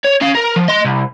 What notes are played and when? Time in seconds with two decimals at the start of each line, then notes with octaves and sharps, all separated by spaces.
0.04 C#5
0.21 C#4 F5
0.35 A#4
0.56 F3
0.69 D#5 C6
0.85 C2